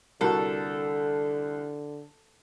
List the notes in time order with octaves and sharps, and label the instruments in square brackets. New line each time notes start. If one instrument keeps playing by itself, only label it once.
[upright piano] C2 [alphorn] D3 [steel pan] F#4 A#4 [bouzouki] A4